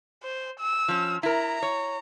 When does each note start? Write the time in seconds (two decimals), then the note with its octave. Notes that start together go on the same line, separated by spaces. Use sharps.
0.23 C5
0.59 E6
0.88 F3 C#4
1.23 E4 A#4 A#5
1.62 C#5